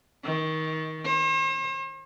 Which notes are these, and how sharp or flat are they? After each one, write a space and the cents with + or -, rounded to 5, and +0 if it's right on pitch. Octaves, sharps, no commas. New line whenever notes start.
D#3 +25
C5 +45